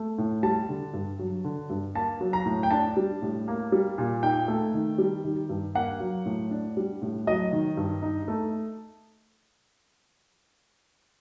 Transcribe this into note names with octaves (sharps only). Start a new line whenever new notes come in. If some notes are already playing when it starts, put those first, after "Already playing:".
Already playing: A3
A2
G3 A5
D3
G2
F#3
D3
G2
A#3 A5
F#3
A#5
A2
G5
D4 A5
G3
A2
A#3
G3
A#2
D#4 G5
A3
D#3
G3
D#3
G2
A#3 F#5
F#3
A2
D4
G3
A2
F#3 D#5
D#3
G2
D#4
A3